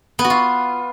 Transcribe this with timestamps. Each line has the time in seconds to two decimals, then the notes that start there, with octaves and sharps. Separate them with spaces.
0.19 B3
0.24 F#4
0.30 F4